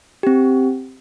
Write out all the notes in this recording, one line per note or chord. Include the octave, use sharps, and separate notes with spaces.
C4 G4